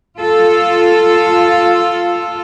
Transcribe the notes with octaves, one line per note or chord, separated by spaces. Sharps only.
F4 A4